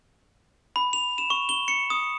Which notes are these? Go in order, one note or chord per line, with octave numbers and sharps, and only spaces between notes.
B5
F7
E7
C#6
G7
C#7
D#6